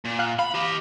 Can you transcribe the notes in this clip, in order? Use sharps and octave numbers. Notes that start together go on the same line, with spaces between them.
A#2
F5 F#6
F5 B5
G4 D#5